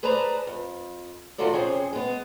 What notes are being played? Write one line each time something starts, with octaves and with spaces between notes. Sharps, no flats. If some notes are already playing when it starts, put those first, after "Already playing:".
G#4 B4 C5 D5 A5 A#5
F2
D#3 A#3 F4 F#4 A4 D5
F2 C3 C#4 G#4 C5
G#3 B3